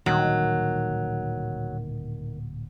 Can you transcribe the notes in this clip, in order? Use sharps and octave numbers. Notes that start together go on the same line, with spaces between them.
D1 A#2 D#3 F#3 G3